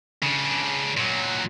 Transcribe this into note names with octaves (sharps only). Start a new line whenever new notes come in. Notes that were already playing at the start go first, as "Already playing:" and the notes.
C#3 D4
A#2 F#3